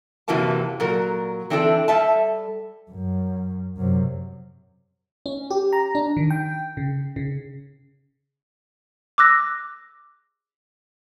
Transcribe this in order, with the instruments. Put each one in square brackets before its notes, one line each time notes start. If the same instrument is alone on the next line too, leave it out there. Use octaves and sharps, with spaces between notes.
[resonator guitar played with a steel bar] F#2 C3 E3 F#3 A#3 A5
A#2 F#3 A#4
E3 C4 D4 E4 A4
G3 A4 E5 A5
[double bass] F#2
F#2 C3
[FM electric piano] C#4
G4
A#5
D4
D#3
G5
C#3
C#3
[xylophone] D6 E6 F#6 A#6